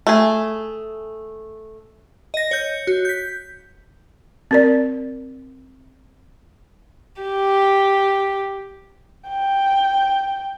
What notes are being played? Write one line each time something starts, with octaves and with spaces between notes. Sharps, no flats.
A3 G#4
D#5 A#6
C#5 G6 C#7
F#4
G6 B6
C4 A#4 D5
G4
G5